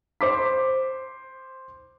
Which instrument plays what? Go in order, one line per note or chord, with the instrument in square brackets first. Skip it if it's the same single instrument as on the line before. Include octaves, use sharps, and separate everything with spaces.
[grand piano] C5 D6 B6